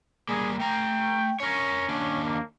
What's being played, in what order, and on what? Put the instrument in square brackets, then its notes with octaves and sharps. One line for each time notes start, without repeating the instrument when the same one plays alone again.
[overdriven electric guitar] G3 A#3 [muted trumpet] G#4
[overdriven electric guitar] A3 A#5 [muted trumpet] G5
[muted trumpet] C#4 [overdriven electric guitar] A#4 C#5
[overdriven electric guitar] D#2 D4
[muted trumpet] A#3